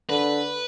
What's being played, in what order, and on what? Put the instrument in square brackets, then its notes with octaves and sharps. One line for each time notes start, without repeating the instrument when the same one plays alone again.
[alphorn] D3 [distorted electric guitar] B4